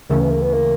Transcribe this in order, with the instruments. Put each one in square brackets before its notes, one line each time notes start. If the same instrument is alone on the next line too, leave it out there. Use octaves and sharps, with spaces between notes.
[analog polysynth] D2 C#3 E3 A3 C#4 [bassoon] A#3
[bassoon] B3
A#3
B3
A#3